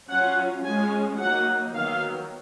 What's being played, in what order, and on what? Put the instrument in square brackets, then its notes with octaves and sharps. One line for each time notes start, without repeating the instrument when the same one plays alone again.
[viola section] F#3 C#4 F4 F#5
G#3 C#4 F4 G#5
F#3 A#3 D#4 F#5
D#3 F#3 B3 F5